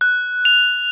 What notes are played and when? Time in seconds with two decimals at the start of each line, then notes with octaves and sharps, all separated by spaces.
0.01 F#6
0.45 F7